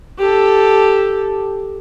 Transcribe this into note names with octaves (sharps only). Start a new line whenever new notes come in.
G4 A4